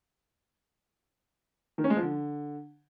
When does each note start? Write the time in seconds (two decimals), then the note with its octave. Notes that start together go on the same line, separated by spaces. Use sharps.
1.78 D#3
1.84 C#4
1.90 G#3
1.96 F3
2.02 D3